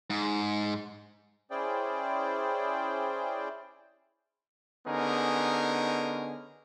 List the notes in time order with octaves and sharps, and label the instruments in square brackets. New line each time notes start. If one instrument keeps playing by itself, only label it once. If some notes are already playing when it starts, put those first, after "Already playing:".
[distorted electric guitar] G#2
[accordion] C#4 E4 G#4 C5 D5 G5
[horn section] D3 B3 C#4 D#4 G#4 A#4